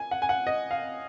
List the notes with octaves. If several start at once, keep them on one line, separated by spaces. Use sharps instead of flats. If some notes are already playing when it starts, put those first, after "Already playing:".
Already playing: G#5
F#5
G#5
F#5
D#5
F5